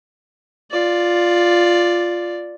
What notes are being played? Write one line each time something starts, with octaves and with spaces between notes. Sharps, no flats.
F4 D5